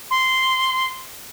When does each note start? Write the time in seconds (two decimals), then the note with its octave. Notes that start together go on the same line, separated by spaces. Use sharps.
0.11 C6